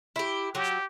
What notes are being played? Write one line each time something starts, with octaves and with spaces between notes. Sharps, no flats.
E4 G4
F#3 G4